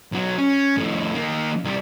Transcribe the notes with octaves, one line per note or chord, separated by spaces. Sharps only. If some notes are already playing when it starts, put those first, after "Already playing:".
B1 F#3
C#4
F2 A2
D#3 A#3
C2 G3